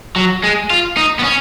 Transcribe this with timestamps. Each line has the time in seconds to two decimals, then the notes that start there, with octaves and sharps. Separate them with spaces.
0.16 F#3
0.44 G#3
0.70 F4
0.97 D#4
1.19 B3
1.23 C#4